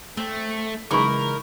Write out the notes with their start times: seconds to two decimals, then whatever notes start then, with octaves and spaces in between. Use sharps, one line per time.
0.17 A3 C4
0.91 C#3 E3 G#3 D#4 E4 A#4 C#6 D6